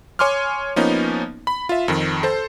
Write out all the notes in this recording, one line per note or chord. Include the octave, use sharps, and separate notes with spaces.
C#5 G#5 C6 D6 F6
F3 A#3 B3 C#4 D#4
B5
F4 E5
F2 D#3
A4 C5